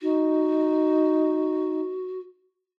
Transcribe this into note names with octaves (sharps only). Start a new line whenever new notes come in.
D#4 F#4